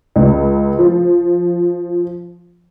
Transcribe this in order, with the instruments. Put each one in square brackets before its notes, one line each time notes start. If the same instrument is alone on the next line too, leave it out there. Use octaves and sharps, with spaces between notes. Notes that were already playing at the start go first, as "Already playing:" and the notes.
[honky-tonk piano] C#2
F3